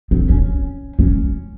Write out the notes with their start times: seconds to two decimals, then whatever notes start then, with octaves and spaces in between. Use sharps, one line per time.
0.11 C4
0.29 C#4
0.99 C#4